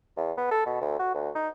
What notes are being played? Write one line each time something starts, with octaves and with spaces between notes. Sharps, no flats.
E2
B3
A4
B2
D2
F#4
D2
D#4